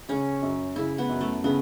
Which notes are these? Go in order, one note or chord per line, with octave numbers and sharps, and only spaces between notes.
C#3 C#4
F#2
C#3 E4
B3
F#2
A3
C#3 B3